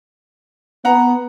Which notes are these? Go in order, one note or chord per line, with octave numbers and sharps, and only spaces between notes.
B3 F#5 A#5